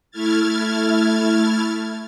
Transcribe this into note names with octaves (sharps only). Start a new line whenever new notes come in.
A3 E4 F6 G#6 A6